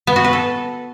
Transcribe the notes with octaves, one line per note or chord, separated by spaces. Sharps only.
B3
F#4
B4
A4